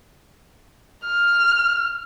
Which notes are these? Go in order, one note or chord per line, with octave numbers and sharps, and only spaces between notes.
F6